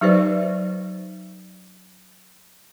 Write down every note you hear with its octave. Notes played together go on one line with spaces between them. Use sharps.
F#3 D#4 G4 B4 C5 D5